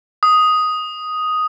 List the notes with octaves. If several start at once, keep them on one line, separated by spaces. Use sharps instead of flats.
D#6